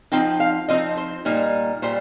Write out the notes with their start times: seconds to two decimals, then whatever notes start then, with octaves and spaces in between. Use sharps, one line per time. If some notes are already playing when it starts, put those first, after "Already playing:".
0.12 F3 C4 D#4 G5
0.40 F5
0.68 F3 C4 D#4 D#5
0.97 C5
1.25 A#2 G3 A#3 D#4
1.82 A#2 G3 C5